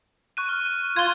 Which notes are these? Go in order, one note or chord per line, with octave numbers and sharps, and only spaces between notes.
C#6 F#6 D#7
F6
F4 G#6 G7